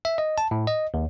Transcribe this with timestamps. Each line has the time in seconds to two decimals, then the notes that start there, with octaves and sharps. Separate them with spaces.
0.05 E5
0.18 D#5
0.38 A5
0.51 A2
0.67 D#5
0.94 D#2